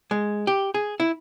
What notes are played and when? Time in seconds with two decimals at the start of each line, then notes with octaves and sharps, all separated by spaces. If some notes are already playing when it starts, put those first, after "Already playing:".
0.11 G#3
0.47 G4
0.74 G#4
1.00 E4